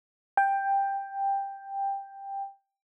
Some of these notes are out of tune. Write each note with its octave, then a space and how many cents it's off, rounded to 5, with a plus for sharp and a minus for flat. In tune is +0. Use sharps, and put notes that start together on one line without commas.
G5 +10